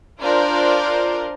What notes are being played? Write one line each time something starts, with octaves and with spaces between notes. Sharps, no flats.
D4 F4 A#4 C5 D5